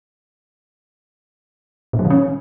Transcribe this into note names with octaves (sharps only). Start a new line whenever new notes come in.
A#2
F#3
D#3
C#4